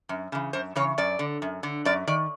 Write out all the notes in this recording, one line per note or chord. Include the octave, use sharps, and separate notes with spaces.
F#2
C#3 E3
F#2 C5
C#3 E3 C#5
F#2 D5
D3
F#2
D3
F#2 D5
D#3 D5